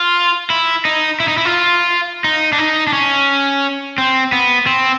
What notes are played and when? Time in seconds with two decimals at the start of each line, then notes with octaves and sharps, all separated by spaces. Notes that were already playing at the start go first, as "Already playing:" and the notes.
Already playing: F4
0.50 E4
0.85 D#4
1.20 E4
1.28 D#4
1.37 E4
1.45 F4
2.24 D#4
2.53 D4
2.59 D#4
2.87 D4
2.93 C#4
3.98 C4
4.32 B3
4.67 C4